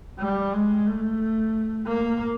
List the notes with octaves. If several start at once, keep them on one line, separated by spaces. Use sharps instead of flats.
G3
G#3
A3
A#3